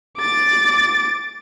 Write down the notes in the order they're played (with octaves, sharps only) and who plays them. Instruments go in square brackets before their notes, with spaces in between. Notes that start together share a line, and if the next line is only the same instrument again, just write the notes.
[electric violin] D6 A6